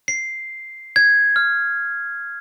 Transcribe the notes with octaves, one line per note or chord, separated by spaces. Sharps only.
C7
G#6
F6